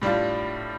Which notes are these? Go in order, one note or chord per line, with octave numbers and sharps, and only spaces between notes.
A2 G3 D4 F4